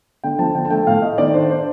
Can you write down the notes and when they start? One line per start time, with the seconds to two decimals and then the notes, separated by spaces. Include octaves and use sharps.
0.24 D3 G5
0.39 F3 A5
0.55 D3 G5
0.65 A5
0.70 A3 G5
0.87 A2 F5
1.02 A3 D#5
1.18 D#3 D5
1.34 D4 C5
1.50 D4 C5